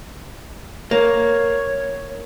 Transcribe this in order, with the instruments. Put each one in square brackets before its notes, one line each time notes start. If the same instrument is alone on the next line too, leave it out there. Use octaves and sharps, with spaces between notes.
[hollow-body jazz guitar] A#3 [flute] C#5